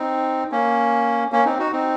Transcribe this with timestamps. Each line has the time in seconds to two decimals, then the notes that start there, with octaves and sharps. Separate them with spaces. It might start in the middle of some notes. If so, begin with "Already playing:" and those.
Already playing: C4 D#4
0.51 A#3 C#4
1.32 A#3 C#4
1.45 C4 D#4
1.59 D#4 F#4
1.72 C4 D#4